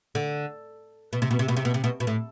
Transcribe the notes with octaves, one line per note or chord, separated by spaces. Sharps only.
D3
B2
C3
B2
C3
B2
C3
B2
C3
B2
B2
A2